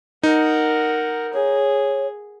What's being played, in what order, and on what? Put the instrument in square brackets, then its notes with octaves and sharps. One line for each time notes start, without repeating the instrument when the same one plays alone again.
[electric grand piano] D#4 [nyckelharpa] A#4 F#5
[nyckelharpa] G#4 [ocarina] C#5